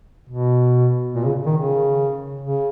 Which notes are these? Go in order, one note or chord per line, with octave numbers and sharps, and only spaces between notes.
B2
A#2
C#3
D#3
C#3
C#3